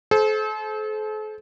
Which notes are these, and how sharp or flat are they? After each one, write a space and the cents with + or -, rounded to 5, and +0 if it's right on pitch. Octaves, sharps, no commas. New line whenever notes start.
A4 -40 C5 +0